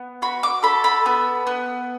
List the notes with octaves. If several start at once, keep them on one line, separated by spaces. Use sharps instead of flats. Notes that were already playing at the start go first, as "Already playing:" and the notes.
Already playing: B3
F#4 B5
D6
A4 B5
B5
B3
B3